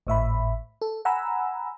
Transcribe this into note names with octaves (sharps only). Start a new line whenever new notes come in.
G#1 A2 E5 B5
A4
F#5 G#5 A#5 B5 E6